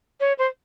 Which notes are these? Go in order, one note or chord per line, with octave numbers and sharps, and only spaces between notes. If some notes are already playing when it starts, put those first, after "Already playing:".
C#5
C5